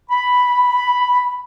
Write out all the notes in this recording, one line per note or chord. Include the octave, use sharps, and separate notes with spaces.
B5